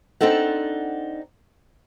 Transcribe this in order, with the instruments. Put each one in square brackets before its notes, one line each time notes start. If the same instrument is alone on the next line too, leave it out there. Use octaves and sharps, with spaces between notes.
[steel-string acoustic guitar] C4 D4 D#4 A4 F#5